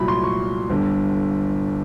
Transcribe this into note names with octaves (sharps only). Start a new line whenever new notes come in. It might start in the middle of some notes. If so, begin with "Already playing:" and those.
Already playing: C2 A#2 F#3 B5
C6
C#6
G1 G2 D3